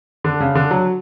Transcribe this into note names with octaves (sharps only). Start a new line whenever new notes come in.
D3
C#3
D3
F#3